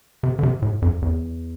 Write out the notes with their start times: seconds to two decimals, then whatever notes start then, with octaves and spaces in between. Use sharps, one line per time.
0.23 C3
0.39 D3
0.43 C3
0.62 A2
0.82 F2
1.02 E2